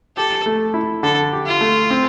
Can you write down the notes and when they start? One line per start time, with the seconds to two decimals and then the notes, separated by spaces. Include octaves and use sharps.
0.16 G4 A4
0.46 A3
0.74 E4
1.03 D3 A4
1.33 G4
1.46 F4
1.61 A3
1.90 C4